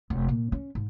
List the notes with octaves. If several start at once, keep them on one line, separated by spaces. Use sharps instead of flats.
F1
A#2
C#4
G#2